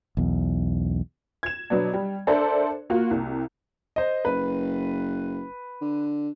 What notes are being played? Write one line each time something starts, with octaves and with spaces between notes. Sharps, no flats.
B1 E2
G#6 E7
B2 F#3 B3 D4
G3
D4 A4 A#4 C5 D5 E5
A#3 F4 F#4
C2 C3
C5 D#5
F#1 B4
D3